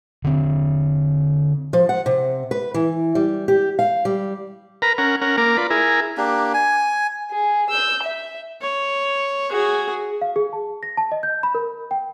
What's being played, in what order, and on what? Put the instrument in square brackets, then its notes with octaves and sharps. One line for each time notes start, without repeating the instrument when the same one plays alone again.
[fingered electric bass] D3 C4
[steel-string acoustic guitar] F3
F#5
C3
B4
E3
G3
G4
F5
G3
[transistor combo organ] A#4 B4 A#5
C#4 A#4 F#5
C#4 A#4 F#5
A#3 A#4 D6
F4 B4 D5
E4 G#4 A#4
[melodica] A#3 D4 G4
G#5
[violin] G#4
E6 G6
E5
[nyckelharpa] C#5
F#4 G#4
[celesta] F5
G#4
A5
A#6
A5
D#5
G6
B5
A#4
G5